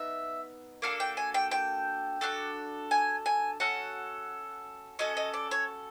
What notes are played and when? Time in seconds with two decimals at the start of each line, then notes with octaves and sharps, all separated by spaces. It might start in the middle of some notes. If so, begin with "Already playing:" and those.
Already playing: B3 D#4 E5
0.82 A#3 D4 F#4 A4 F5
1.00 G5
1.17 G#5
1.34 G5
1.51 G5
2.21 D4 F#4 A4
2.91 G#5
3.26 G#5
3.60 C#4 F#4 A4 F#5
4.99 C#4 F#4 A4 D#5
5.17 D#5
5.34 D5
5.51 C#5